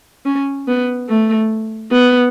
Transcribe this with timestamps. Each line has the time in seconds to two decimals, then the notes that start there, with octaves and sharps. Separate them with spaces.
0.26 C#4
0.68 B3
1.08 A3
1.91 B3